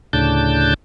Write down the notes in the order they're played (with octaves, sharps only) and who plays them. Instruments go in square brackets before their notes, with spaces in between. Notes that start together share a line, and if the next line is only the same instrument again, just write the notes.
[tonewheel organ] D2 A2 C#3 D4 A5 G6